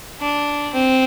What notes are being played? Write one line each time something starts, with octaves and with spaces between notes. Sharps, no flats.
D4
C4